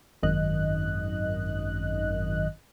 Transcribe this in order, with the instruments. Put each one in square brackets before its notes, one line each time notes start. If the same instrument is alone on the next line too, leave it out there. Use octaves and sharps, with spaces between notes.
[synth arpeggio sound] G#1 F#2 D#3 D#5 F#6